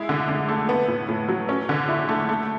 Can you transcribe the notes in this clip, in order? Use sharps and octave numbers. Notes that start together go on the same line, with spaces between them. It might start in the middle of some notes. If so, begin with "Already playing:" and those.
Already playing: G#3 E4
D3
D3
A3
B3
A2
A2
F#3
C#4
D3
E4
A3
A3